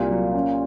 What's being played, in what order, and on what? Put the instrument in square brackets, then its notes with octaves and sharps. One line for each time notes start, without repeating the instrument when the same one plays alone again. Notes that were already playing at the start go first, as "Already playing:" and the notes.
Already playing: [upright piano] C2 [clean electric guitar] A#2
[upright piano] F#3
C#4